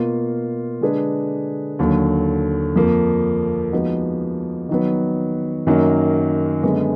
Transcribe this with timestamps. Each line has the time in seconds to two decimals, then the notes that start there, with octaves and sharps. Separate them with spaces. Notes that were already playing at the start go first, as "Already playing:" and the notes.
Already playing: B2 A#3 F4
0.81 D3 G#3 D4 G#4 B4
1.79 D#2 D3 F#3
2.76 F2 F3 A#3
3.72 F3 G#3 B3 D#4 F#4
4.69 D#3 F#3 B3
5.67 F#2 D#3 F#3 A#3
6.63 F#2 D3 G#3 B3